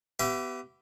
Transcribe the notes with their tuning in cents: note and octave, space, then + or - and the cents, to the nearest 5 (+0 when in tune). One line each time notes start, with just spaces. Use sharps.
B3 +20 G4 -20 E5 +25